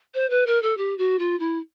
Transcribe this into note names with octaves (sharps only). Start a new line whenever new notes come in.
C5
B4
A#4
A4
G4
F#4
F4
E4